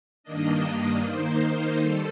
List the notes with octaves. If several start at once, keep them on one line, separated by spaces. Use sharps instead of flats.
G2 D#3 A#3 D4 D#5
D#5
D#3 A#3 D#4 C5
D#3 G3 A4